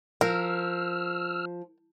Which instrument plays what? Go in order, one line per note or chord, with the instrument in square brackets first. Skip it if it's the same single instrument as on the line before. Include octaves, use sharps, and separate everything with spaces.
[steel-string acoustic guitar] F3 [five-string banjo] A#4 [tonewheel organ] E6 F6